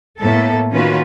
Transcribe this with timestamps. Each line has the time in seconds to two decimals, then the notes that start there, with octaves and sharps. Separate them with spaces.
0.19 A2 A#3 B3 A4
0.71 D#3 A#3 C#4 F4 F#4 B4